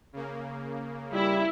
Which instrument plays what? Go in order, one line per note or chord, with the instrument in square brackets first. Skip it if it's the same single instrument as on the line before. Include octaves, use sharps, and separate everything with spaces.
[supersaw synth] C#3 A#3
[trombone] G3 [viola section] E4